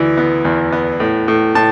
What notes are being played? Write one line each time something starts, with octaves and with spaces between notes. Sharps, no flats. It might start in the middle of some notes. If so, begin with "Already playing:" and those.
Already playing: D2 E3
B3
E2
B3
A2
A2
A2 A5